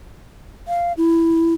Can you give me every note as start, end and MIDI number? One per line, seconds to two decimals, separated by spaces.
0.68 0.93 77
0.98 1.54 64